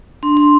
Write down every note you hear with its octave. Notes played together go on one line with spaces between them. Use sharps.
D4 C6
C6